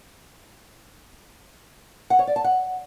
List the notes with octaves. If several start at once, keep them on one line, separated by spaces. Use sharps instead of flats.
F#5
C#5
D5
A5
F#5